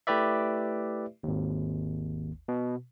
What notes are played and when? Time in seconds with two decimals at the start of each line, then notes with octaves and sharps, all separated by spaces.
0.07 A3 E4 G4 B4 D5 E5
1.23 G#1 D#2
2.48 B2